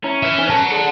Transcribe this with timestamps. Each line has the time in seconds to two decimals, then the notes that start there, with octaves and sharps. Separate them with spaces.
0.04 C#4 E4 A#5 B5
0.23 B4 E5
0.38 D#4 C5 G#5
0.50 B4 F#5 A5 A#5
0.71 D4 G#4 A4